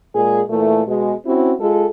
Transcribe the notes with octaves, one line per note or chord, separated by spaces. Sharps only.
A#2 G#3 G#4
A#2 E3 A3
B2 G#3
C4 C#4 E4 F#4
G#3 F4 A4